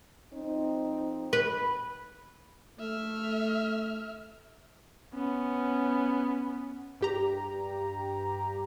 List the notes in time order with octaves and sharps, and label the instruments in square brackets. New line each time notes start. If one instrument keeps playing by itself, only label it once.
[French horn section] F2 C4 D#4
[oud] B4
[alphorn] A3 [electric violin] E5 F6
[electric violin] B3 C#4
[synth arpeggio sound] G2 G4 A#5